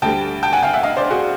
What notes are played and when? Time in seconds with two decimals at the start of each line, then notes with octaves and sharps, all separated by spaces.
0.02 D2 D3 G3 G5 A5
0.43 G5 A5
0.53 F#5 G#5
0.63 F5 G5
0.73 E5 F#5
0.83 D#5 F5
0.97 C5 D5
1.10 F#4 G#4